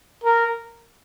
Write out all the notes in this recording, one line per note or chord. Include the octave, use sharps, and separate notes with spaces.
A#4